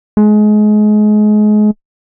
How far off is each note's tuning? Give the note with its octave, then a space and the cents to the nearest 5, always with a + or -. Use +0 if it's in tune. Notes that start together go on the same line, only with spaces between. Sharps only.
G#3 +30